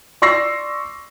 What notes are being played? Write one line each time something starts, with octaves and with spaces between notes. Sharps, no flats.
D5 C6 C#6 E6 A#6 C7